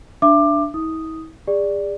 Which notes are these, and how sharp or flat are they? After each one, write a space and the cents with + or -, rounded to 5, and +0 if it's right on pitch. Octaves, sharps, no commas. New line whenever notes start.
D4 +0 E5 +30 D6 +20
E4 -45 D#6 +0
G#4 -35 D5 +0